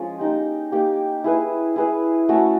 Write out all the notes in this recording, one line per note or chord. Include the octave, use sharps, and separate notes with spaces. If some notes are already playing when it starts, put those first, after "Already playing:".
Already playing: F3 G#3 C#4
A#3 D#4 G4
A#3 D#4 G4
E4 G#4 B4 E5
E4 G#4 B4 E5
A3 C#4 F#4